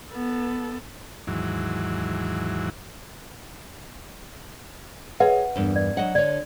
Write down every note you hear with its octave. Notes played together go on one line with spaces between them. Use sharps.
B3 A4
D#2 G#2 E3 F#3
G#4 B4 C#5 E5 F#5
E2 G2 A#4
D5
F#3 D#5 F#5
D3 C#5 D5